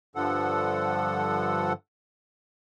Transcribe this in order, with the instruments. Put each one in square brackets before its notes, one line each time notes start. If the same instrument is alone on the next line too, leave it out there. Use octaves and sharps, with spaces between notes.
[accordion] G2 D3 F3 A4 F#5